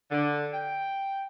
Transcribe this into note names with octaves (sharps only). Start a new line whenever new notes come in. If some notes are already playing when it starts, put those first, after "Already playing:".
D3
G5